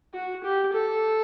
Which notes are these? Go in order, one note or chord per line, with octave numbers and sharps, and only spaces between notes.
F#4
G4
A4